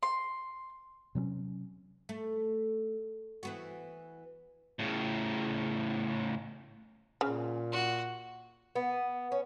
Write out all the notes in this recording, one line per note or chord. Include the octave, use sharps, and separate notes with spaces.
C6
C3 F#3 C4 C#4
A3
E3 B3 F#4
A2 C#3
A#2 C#3
F#4
B3
C#4